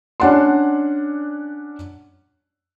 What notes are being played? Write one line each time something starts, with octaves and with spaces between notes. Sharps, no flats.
C#4 D4 D5 F#5 A5 C6